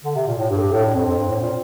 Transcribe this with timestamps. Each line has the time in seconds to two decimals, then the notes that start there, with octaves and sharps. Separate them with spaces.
0.04 D3
0.15 C3
0.27 A#2
0.38 A2
0.50 G2 G4
0.57 A4
0.61 G4
0.72 A2 A4
0.84 D4
0.95 F2 C4
1.06 F2
1.18 G2
1.29 A2
1.41 A#2